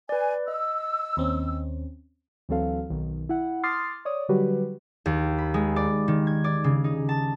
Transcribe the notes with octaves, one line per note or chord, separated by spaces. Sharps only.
B4 D5 G#5
D#5 E6
D#2 C4 C#4
D2 E3 F#3 C4 A4 F5
B1 D#3
E4 F#5
C6 D6 D#6 F6 A6 C7
C#5 D5 D#6
D3 F#3 G3 F#4 G4 B4
D#2
B5
G#3
D5
D#3
G#6
D5
C#3
D#4
A5